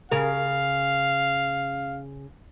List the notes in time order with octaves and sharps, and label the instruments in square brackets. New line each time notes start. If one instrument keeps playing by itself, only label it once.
[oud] C#3 A#4 [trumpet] F5